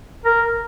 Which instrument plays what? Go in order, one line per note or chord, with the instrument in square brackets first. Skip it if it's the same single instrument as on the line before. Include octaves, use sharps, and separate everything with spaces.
[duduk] A#4